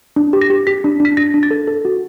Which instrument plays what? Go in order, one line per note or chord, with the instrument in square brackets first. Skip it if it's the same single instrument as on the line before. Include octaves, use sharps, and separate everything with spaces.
[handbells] D4
G4
A#6
G4
G4 B6
D4
D4
B6
D4 A#6
D4
A6
A4
A4
F#4